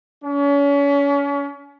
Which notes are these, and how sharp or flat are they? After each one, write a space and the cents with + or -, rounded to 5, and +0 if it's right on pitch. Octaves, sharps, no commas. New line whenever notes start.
C#4 +35